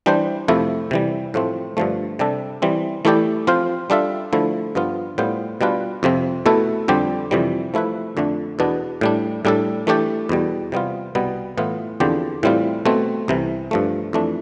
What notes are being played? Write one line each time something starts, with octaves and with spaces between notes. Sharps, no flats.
E3 G3 D4 G4 C5
F2 C3 F3 A3 E4
C3 E3 G3
A2 F3 A3 C4
G2 D3 F3 A3
C3 G3 D4 A4
E3 G3 C4
E3 A3 E4 G4 D5
F3 C4 F4 C5 F5
G3 D4 F4 A4 E5
D3 F3 A3 E4
G2 F3 B3 F4
A2 G3 B3 F4 C5
B2 G3 D4 F4 B4
F2 C3 F3 C4
B2 A3 E4 A4
F2 D3 G3 C4 G4
F2 C3 E3 G3
F3 A3 E4 B4
F2 D3 A3 D4
E2 B2 B3 D4
A2 G3 D4
A2 G3 D4 A4
E3 A3 D4 G4 D5
E2 B2 G3
C3 G3 B3 F4
C2 B2 G3 B3
A2 E3 B3 F4
E2 D3 F3 C4 G4
A2 E3 G3 C4 F4
B2 A3 C4
C2 C3 E3
G2 F3 A3
F2 E3 A3 D4